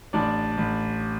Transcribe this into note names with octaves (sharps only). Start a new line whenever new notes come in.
A1 D4 D5
A1